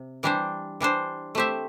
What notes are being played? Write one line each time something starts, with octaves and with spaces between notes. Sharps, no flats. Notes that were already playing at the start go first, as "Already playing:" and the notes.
Already playing: C3
E3 G3 D4 G4 C5
E3 G3 D4 C5
A3 C4 G4 C5 E5